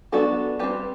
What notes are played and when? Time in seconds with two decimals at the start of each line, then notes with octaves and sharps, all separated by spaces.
0.12 F#3 B3 D4 F#4 A4
0.59 G3 C4 G4 B4